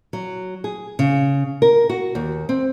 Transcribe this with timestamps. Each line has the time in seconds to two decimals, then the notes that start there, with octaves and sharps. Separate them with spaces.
0.13 F#3
0.64 G#4
0.99 C#3
1.62 A#4
1.89 F#4
2.15 D#2
2.49 C4